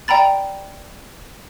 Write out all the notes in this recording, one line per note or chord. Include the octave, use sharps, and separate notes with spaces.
D5 G5 A#5 B5 A6